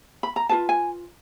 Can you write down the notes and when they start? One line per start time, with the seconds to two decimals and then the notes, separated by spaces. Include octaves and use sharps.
0.23 B5
0.36 A#5
0.49 F4 G#4 B4 A5
0.69 G#5